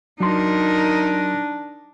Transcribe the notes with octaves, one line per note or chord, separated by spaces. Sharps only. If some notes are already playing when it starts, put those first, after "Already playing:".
F#3 D4 D#4 A#4 C6